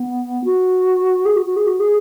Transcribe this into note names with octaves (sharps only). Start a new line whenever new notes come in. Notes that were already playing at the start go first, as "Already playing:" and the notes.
Already playing: B3
F#4
G#4
F#4
F#4
G#4
F#4
G#4